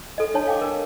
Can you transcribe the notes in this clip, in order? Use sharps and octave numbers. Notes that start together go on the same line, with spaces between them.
A4 D#5
D4 C#5 A5
F5 G5 D6
A#4